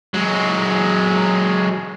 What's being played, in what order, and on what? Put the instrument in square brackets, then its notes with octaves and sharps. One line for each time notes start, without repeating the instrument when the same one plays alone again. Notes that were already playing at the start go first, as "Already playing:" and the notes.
[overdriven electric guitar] F#3 G#3